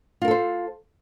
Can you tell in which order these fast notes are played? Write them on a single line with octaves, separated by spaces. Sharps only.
F4 A#4 A4 C5